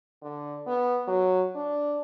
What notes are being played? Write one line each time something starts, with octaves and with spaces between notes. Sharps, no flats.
D3
B3
F#3
D4